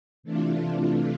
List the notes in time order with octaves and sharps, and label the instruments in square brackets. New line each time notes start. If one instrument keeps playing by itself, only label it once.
[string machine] C3 E3 A3 D4 F4